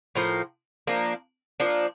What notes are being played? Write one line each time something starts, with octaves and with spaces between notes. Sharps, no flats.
A2 F3 A#3
F3 A#3 D4
F3 A#3 D4